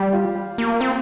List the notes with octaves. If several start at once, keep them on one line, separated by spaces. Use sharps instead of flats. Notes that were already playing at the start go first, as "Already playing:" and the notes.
Already playing: G3 G4
F4
G3
A#3
C4